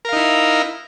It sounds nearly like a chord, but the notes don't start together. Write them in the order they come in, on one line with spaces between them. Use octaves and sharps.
A#4 F5 D#4 E4